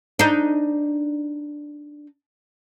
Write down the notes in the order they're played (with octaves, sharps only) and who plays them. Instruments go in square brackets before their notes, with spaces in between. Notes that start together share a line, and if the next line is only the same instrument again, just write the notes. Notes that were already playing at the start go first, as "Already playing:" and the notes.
[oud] D4 D#4